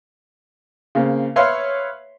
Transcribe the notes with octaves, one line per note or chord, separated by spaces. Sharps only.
C#3 A#3 C4
B4 C#5 E5 F5 C6